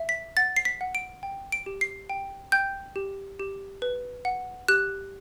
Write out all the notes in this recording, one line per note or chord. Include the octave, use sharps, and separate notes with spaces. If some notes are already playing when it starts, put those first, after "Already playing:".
Already playing: E5
B6
F#5 A6
C7
B6
F#5
D7
G5
D7
G4
C7
G5
G5 G6
G4
G4
B4
F#5
G4 F#6